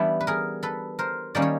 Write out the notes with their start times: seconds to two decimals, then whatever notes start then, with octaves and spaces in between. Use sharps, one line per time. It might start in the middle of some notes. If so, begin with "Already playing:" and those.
Already playing: E3 G3 B3 D4 E4
0.20 B4
0.27 G#4 A#4
0.63 A4 B4
0.99 A#4 C5
1.35 D#3 G3 A#3 C#4 D5
1.42 C#5